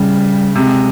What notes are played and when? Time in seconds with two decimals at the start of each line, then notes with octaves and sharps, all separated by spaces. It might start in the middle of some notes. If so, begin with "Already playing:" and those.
Already playing: C#3 G3
0.56 C3 G#3